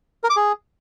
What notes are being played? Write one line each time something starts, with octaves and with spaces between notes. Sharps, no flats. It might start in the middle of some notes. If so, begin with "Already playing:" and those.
A#4
D6
G#4